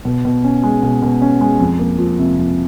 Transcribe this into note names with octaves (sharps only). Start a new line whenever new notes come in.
B2
B2
C#4
G#3
B2
B2
C#4
G#3
F2
A#3
F3
C3
F2